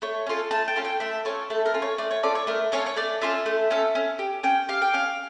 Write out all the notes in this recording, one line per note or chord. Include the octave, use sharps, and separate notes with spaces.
A3 C#5
C#4 F4 A4
A3 A5
G5
C#4 F4 A4
G5
A3 E5
C#4 F4 A4 C#5
A3 A4
A#4
C#4 F4 A4
C#5
A3 D5
C#5
C#4 F4 A4 D5
C#5
A3 A#4
C#4 F4 A4 C#5
C#5
A3 D5
C#4 F4 A4 E5
A3
C#4 F4 A4
C#4
G4
C#4 G5
G4 F5
G5
C#4 F5